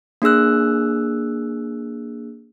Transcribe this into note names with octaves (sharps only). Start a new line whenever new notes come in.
A#3 D4 G#4 E6 F#6